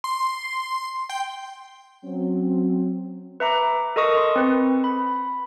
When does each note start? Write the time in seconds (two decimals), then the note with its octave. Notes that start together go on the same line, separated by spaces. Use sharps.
0.04 C6
1.09 G5
2.05 F#3 C4 C#4
3.40 B4 E5 A#5 D6
3.96 A4 A#4 D#5 C#6 D#6
4.17 C6
4.36 C4 B4
4.84 B5